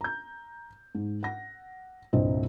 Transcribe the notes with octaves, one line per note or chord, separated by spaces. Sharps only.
A#5 G6
G#2
F#5 A#6
D#1 C2 G2 C4 D#5